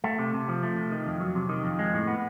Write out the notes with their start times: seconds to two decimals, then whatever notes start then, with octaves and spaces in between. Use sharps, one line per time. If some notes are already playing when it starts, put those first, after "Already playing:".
0.04 A3
0.19 C3
0.34 C3
0.49 F3
0.63 A3
0.76 C3
0.91 D#3
1.07 F2
1.20 F#3
1.35 C3
1.49 D#3
1.64 F2
1.79 G#3
1.94 A2
2.07 B3